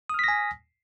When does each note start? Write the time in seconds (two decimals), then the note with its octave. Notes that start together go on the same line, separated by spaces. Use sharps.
0.10 D#6
0.14 F6
0.19 B6
0.24 A#6
0.28 G#5